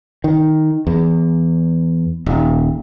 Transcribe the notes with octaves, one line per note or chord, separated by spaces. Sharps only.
D#3
E2
D#1